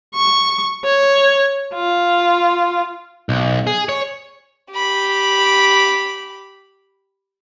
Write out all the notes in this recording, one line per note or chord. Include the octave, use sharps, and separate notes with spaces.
C#6
C#5
F4
B1
G#4
C#5
G4 B5